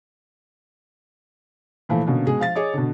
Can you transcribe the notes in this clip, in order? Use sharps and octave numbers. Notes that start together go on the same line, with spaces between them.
A#2 E3 F3 A3
B2 D3 A#3 C#4
B2 G#3 G#4
F3 F5 A6
G#4 C#5 D#5 D6
B2 D3